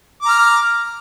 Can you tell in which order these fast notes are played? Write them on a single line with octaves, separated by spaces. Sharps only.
D6 A#5 F6